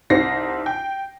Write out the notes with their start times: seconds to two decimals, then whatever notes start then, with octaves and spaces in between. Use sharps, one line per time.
0.10 C2 C4 D#4 A#6 C7
0.66 G5